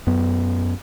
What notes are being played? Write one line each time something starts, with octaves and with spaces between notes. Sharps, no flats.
F#2 B3